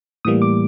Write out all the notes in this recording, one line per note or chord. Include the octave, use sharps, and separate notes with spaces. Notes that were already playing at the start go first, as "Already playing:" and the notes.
A2 E3 G3 A#3 D#6
D6